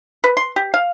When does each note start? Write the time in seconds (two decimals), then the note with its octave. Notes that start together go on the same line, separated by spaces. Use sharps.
0.24 B4
0.37 C6
0.56 G4
0.74 F5